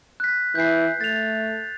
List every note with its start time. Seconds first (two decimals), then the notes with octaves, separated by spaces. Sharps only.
0.20 F#6 B6
0.55 E3 G6 C7
1.01 A3 A6 F7